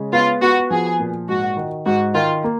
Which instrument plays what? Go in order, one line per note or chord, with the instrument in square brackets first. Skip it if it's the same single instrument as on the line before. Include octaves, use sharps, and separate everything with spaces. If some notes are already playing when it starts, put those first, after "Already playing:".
Already playing: [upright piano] C#3 G#3
[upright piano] B3 [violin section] F4
[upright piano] B3 [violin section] F#4
[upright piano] F3 [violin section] G#4
[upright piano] A#2
[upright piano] G#2 [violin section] F#4
[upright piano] D#3
[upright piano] G#2 [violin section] F#4
[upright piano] D#3 [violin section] F4
[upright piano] A#3